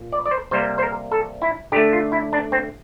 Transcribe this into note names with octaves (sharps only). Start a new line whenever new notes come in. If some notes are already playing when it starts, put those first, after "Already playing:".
Already playing: A#2 A#3
D5
D5
C5
C3 G3 A#3 C5
C5
A#4
A4
E4
D3 A3 G4
F4
E4
D4
C4